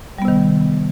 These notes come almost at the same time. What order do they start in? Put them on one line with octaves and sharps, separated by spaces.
G3 B3 C3 D#3